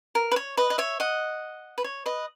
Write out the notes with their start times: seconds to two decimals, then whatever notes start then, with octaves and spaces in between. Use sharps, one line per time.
0.15 A#4
0.31 B4
0.36 C#5
0.57 B4 D#5
0.70 D#5
0.78 C#5 E5
1.00 D#5 F#5
1.78 B4
1.84 C#5
2.06 B4 D#5